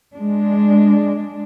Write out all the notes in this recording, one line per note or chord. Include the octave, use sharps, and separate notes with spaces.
G#3 D4